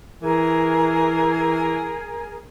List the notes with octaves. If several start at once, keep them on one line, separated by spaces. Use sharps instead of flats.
E3 G#4 A#4 G#5